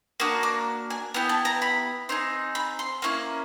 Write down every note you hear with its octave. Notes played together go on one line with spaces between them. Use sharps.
A#3 D4 F#4 D#6
D6
G#5
B3 E4 G4
A5
A#5
B5
C4 D#4 G#4
B5
C6
A#3 C#4 E4